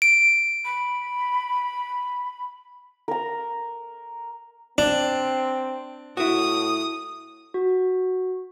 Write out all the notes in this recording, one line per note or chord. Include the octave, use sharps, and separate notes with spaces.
D7
B5
A#4 A#5
C4 D4
A2 E4 F#4 D#6
F#4